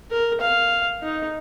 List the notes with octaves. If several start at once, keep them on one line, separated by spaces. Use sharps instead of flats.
A#4
F5
D#4